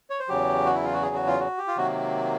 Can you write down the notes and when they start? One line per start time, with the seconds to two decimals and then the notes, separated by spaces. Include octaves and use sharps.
0.10 C#5
0.20 C5
0.29 E2 C#3 F#3 G4
0.66 F#4
0.75 E4
0.84 F4
0.93 F#4
1.03 G#4
1.15 F#4
1.27 F4
1.40 F#4
1.58 G4
1.68 F4
1.77 C3 D#3 F#3 A#3 F#4